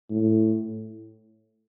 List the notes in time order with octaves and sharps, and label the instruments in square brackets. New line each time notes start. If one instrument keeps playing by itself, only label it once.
[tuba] A2